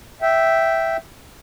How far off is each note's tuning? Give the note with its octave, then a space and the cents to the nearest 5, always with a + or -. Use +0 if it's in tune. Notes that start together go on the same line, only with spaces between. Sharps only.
E5 +0 G5 -10